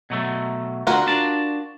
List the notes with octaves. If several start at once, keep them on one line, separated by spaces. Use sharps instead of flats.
B2 F#3 A3
D2 D3 F4 F#4 A#4
D4 A5